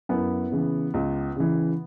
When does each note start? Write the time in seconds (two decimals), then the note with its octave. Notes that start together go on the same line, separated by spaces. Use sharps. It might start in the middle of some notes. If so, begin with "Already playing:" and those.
0.09 F#2 B3 E4
0.52 C#3 E3
0.94 C#2
1.36 C#3 E3